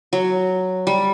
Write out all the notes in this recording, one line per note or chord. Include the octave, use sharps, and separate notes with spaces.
F#3
G3